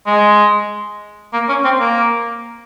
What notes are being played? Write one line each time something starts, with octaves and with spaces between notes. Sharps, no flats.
G#3
A#3
C#4
C4
A#3